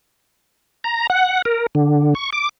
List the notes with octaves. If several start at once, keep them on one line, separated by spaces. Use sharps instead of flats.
A#5
F#5
A#4
D3
C#6
D6